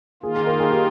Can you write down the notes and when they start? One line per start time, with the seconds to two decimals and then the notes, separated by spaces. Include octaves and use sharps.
0.23 D#3 A#3 F4 G#4
0.36 G#4
0.46 A#4
0.59 G#4
0.71 G4